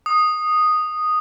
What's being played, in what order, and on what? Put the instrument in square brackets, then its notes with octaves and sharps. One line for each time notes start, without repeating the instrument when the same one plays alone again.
[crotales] D#6